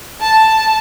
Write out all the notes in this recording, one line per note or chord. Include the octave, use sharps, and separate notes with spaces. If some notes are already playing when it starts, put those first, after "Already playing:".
A5